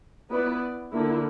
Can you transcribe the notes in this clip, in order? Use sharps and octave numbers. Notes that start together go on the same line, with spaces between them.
B3 E4 B4 D5
D3 A#3 E4